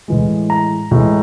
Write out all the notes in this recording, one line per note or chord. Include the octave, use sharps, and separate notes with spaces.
A2 E3 G#3
A#5
A2 E3 G#3